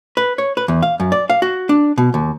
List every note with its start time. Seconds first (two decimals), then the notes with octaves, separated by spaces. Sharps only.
0.17 B4
0.38 C#5
0.57 B4
0.68 E2
0.82 F5
1.00 F#2
1.12 D5
1.30 F5
1.42 F#4
1.69 D4
1.98 B2
2.14 D#2